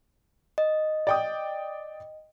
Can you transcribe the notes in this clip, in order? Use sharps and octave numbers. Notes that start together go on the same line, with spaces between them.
D#5
D5 G5 D#6